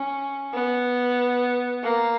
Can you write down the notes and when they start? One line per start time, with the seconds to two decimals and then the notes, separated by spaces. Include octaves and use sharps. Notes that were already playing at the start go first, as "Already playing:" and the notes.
Already playing: C#4
0.54 B3
1.83 A#3